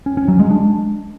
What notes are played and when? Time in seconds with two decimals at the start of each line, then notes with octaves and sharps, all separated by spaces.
0.06 C#4
0.17 C#4
0.28 F#3
0.39 G#3
0.50 D4